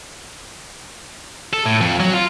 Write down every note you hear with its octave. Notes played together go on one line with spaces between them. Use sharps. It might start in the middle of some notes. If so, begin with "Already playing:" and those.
A4
A2
F2
F#3
F4